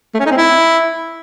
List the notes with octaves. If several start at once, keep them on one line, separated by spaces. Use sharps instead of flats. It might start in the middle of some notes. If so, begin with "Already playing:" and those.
A3
C#4
D#4
C4
E4